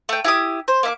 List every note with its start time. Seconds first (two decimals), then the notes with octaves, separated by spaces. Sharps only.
0.09 A3 G5
0.24 E4 G4 D#6
0.68 C5
0.83 A#3 E5 D6